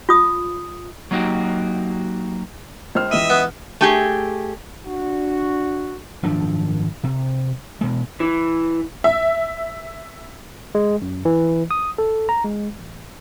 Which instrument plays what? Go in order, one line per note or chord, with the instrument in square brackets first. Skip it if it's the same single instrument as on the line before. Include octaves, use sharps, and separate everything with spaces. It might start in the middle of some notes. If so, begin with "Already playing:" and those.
[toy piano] F4 D#6
[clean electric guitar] F#3 A#3 B3 D#4 F#4 G4
[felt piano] C#2 C5 F6
[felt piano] C#2 E3 D#7 [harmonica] D#5 E5
[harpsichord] B3
[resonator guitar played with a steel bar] A3 G4 G#4
[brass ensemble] D4 F#4
[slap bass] G#1 F#2 F3 D4
C3
B2 G#3
[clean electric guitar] E3
[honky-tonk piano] E5
[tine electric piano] G#3
F#2
E3
D#6
A4
A#5
G#3
A1